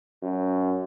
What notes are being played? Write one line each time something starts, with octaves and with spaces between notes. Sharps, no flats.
F#2